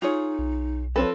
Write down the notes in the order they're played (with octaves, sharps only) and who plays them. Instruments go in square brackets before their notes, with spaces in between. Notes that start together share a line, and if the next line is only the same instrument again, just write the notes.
[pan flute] D#4 [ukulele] F4 G#4 C#5
[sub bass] B1
[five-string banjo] F3 C4 A4 [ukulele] B4 [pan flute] C#5